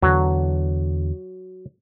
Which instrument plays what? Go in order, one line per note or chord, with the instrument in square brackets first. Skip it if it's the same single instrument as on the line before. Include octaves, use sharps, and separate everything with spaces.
[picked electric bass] E2 D3 [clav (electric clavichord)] F#3